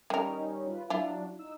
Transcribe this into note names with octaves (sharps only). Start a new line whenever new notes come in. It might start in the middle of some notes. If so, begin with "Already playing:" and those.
D#3 G3 C#4 D#4 A#4
F4 B4
F#3 D4 E4 F4
D#4 E6